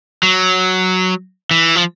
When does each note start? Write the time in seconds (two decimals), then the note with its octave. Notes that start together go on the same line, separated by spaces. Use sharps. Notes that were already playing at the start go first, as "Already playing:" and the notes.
0.23 F#3
1.51 E3
1.76 F3